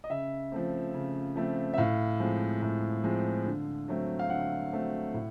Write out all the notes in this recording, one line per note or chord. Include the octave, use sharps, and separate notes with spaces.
D#5
C#3 E5
F3 A3 C4
C#3
F3 A3 C4
E5
A2 F5
F3 G#3 C4
A2
F3 G#3 C4
D3
F#3 A3 C4
F5
D3 F#5
F#3 A3 C4
A2